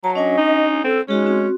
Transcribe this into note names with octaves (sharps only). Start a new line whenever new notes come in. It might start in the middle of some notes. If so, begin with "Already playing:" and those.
F#3 A5 A#5
C#4 D4 D#5 G#5
D#4
C4 A4
G#3 C#4 D#4 F#4 G#4
C4 F#4